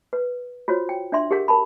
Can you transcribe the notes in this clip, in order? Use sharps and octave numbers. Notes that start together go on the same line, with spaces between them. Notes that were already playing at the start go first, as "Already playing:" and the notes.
B4
F4 F#4 C5 C#5
G5
D4 D5 E5 C6
G4 G#4 A#4 F#5
A#4 A5 B5